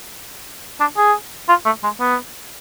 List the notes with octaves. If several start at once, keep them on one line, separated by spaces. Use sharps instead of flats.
D4
G#4
F4
A3
G#3
B3